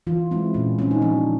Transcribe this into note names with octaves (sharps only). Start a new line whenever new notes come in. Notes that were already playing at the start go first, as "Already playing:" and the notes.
E3 F4
G#3 C4 E4
A#2 C#4
G3 C4 C#4
D#4
F3 D4